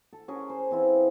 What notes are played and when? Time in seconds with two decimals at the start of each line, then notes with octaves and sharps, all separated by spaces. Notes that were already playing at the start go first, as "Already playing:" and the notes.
0.13 A4
0.28 C#4 G#4 A#4
0.50 C5
0.71 E3 C4 E4 F4